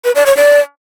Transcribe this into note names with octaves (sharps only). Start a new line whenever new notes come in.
B4
D5
C#5
D5